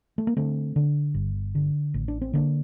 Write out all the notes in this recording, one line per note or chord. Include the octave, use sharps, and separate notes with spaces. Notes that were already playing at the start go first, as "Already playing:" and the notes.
A3
A#3
D3 A3 C4
D3
G1
D3
A1
D4
C4
D3 A#3 D4